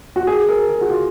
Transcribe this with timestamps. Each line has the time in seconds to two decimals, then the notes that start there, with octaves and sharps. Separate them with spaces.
0.16 F#4
0.27 G#4
0.49 A#4
0.69 G#4
0.81 F#4
0.90 F4